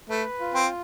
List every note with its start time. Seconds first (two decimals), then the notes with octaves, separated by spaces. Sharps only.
0.10 A3 B4
0.40 F4
0.54 C4